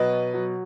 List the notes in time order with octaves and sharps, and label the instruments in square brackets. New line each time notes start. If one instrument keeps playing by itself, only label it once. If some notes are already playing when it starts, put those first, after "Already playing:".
Already playing: [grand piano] B2 F#3 B4 D#5
F#3